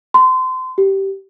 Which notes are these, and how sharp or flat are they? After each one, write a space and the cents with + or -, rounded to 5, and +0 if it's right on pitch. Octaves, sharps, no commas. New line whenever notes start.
C6 -30
G4 -15